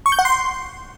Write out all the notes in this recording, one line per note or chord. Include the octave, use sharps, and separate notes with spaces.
C#6
G6
F#5
C6